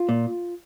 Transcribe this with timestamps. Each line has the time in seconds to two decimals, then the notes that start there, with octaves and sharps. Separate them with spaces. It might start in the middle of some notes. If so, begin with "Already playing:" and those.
Already playing: F4
0.09 A#2